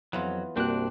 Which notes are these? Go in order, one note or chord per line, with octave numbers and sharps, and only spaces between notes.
F2 E3 F#3 B3 F4
C2 G2 A#3 C4 D4 F#4 F#6